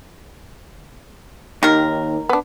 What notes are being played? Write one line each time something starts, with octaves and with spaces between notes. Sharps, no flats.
D#2 D#3 A#4
B3 D4